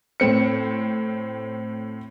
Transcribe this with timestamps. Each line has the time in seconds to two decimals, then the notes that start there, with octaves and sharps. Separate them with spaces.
0.20 A2 C4 C#7